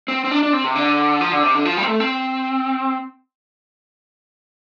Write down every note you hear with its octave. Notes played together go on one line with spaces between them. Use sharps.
C4
C4
D4
D4
C4
C3
D3
F3
D3
C3
D3
F3
G3
C4
A3
C4